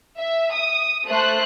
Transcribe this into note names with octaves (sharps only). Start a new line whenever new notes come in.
E5
D#6
A3 C5 F#6